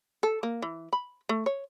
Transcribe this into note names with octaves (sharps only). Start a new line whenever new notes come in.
A4
A#3
E3
B5
A3
C#5